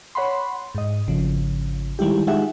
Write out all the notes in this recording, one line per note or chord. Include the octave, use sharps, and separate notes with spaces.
C#5 F#5 B5 C6
G#2 D#5
G#1 C#3 F3
D#3 G3 G#3 E4 G4
G#3 D#4 F4 G4 E5 F#5